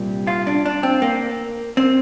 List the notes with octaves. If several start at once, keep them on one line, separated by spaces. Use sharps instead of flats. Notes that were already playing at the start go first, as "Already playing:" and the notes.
Already playing: C2 A#2 G3
F4
D4
D4
C4
A#3
C4